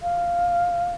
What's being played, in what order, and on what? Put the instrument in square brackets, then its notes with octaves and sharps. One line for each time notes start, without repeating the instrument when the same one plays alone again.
[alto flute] F5